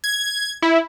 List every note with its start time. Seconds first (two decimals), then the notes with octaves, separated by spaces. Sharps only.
0.04 G#6
0.62 E4